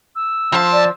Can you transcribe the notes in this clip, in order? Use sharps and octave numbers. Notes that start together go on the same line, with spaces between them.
E6
F2 F3 C5 A5
D5